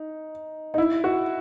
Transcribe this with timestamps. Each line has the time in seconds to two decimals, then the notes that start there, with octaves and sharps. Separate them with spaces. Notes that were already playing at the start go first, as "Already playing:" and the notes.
Already playing: D#4
0.74 D#4
0.78 E4
1.04 F#4